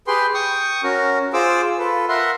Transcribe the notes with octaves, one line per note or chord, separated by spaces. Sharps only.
G4 G#4 B4 G5 C6
G5 C#6 D#6
C#4 F#4 A#4
F4 G#4 C5 D6 E6
F4 A4 B4
A#4 E5 F#5 C6